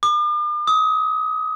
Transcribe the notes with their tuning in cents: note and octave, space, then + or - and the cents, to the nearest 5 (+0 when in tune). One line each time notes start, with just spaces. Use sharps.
D6 +45
D#6 +30